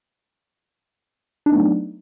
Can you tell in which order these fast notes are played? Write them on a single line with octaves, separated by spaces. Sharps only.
D4 D#4 B3 A3 F#3